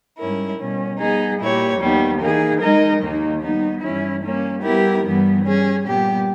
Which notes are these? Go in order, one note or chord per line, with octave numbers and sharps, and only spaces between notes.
G#2 G3 C#4 E4 A#4
B2 G3 C#4
G3 B3 D#4 G#4
A#2 A#3 E4 G4 C#5
D#2 D#3 G3 B3
E3 A#3 D#4 G#4
G#3 D#4 A#4 D#5
D#2 D#3 A#3 D#4
D#3 G3 B3 D#4
G2 E3 G3 C#4 E4
G3 A#3 C#4
G3 B3 E4 G4 A#4
G2 E3 G3 B3
G3 C#4 G#4
A#2 G3 B3 G4